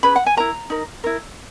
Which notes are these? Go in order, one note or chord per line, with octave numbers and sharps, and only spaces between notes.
C#4 G#4 B4 B5
F#5
G#5
E4 A#4 A#5
D#4 A#4
E4 A#4